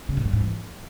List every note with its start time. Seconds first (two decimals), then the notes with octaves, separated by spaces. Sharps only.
0.09 C#3
0.17 A2
0.25 G2
0.33 G#2
0.41 E3